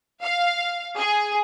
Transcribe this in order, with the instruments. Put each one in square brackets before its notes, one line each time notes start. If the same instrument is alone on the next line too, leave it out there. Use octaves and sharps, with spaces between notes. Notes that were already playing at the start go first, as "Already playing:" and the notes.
[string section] F5
G#4